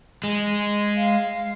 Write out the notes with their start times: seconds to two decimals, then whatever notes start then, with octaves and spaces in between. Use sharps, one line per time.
0.24 G#3
0.97 F5